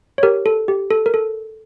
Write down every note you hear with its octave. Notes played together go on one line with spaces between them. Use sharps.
C#5
G4 A#4
A4
G4
A4
A#4
A4